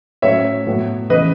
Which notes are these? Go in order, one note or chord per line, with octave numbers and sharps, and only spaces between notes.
A2 F#3 C#4 C#5 E5
A2 F#3 B3
C#3 E3 B4 D#5